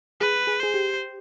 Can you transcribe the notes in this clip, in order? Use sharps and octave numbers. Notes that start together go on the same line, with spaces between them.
G#4 B4
G#4
G#4 C5
G4